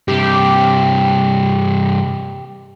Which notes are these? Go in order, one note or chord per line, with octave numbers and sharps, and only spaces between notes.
G2 C3 G4